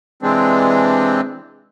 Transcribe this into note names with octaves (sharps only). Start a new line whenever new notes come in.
C3 E3 G#3 C4 D4